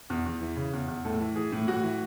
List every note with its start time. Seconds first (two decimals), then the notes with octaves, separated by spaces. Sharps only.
0.10 E2
0.26 E2
0.41 E3
0.56 C#3
0.73 E2
0.88 E2
1.05 A2 A4
1.20 E3
1.36 E3 G#4
1.52 A2
1.67 A2 F#4
1.83 E3